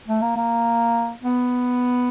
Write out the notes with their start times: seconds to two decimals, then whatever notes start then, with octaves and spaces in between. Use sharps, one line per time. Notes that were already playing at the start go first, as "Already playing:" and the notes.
0.08 A3
0.22 A#3
0.37 A#3
1.23 B3